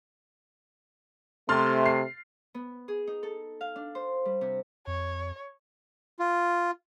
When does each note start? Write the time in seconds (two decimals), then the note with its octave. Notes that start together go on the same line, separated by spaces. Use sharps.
1.49 C3 A3 C6 F6 A6
1.86 C7
2.54 B3
2.88 G#4
3.07 D#4
3.23 A4
3.61 F5
3.76 D4
3.95 C5
4.25 G3
4.41 C3
4.87 F2 C#5
6.19 F4